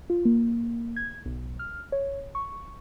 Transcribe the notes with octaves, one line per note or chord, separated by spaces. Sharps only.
F4
A#3
G#6
B1
F6
C#5
C#6